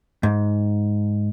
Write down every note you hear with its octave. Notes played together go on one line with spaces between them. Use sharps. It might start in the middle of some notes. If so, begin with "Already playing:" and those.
G#2